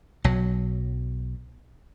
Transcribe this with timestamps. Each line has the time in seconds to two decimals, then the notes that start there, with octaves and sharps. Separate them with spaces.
0.24 B1 F#3